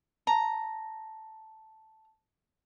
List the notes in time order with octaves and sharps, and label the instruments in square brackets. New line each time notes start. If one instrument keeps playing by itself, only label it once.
[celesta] A5 [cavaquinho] A#5